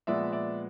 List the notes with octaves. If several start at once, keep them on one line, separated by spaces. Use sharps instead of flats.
A#2 F3 G#3 B3 D5 E5
D5 E5